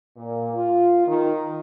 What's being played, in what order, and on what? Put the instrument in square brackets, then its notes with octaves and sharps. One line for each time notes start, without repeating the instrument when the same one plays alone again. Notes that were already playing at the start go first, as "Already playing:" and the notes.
[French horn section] A#2
F4
D#3